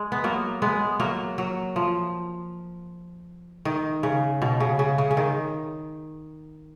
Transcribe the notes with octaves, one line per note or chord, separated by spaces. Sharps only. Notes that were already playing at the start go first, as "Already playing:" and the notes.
Already playing: G#3
B3
F#3 A#3
G#3 B3
F#3 A#3
F#3
F3
D#3
C#3
B2
C#3
C#3
C#3
C#3
D#3